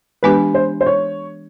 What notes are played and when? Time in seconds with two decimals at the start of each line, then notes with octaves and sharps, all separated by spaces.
0.23 E3 G#3 B3 D4 G4 B4
0.54 C5
0.81 C5
0.86 C#5